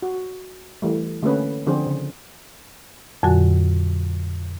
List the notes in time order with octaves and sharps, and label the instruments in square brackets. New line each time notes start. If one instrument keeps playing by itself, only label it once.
[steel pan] F#4
E3 G3 A3
D3 A3 A#3 C#4 B4
D3 F3 C4 D4 G#4 C5
C#3
[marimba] F2 A#2 D3 F#3 F#4 G#5